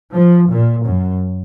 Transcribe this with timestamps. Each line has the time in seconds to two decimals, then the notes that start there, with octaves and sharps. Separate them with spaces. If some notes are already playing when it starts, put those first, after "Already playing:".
0.14 F3
0.49 A#2
0.85 F#2